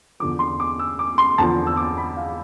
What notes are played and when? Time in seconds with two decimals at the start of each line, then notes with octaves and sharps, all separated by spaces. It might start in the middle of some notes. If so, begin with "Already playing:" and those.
0.20 E2 D3 F3 D6
0.39 C6
0.60 D6
0.79 E6
0.99 D6
1.18 C6
1.38 E2 D3 F3 A5
1.67 E6
1.77 D6
1.97 B5
2.17 F5